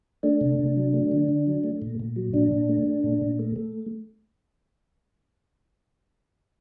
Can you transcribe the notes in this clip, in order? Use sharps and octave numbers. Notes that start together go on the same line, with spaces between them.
A3 D4
C3
C3
F#3
A3
D3
D3
F#3
A3
A#2
A#2
F#3
A#2 D4
A#2
A3
A3
A#2
A#2
A3
A3